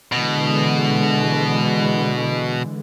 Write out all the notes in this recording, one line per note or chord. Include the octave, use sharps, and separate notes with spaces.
B2 D3 E3 G#3